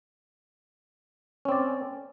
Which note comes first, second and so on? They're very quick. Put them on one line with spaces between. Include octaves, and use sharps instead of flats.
C#4 C4 D5